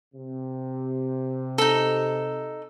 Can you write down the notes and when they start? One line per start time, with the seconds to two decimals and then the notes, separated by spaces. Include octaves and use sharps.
0.14 C3
1.58 D#4 A4